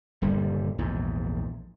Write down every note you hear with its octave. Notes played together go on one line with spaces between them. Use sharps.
D#1 G2 D3 G3
A#1 E2 G#2